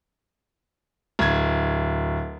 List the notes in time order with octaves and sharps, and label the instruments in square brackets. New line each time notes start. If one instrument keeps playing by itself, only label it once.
[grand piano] D1 G#6